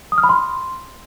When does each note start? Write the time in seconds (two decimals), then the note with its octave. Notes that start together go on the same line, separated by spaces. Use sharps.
0.12 D#6
0.18 F6
0.24 B5
0.29 C6